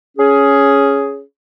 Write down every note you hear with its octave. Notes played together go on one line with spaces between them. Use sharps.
C#4 G#4